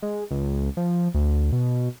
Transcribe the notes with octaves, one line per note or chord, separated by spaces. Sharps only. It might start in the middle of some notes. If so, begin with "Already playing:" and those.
G#3
C#2
F3
D2
B2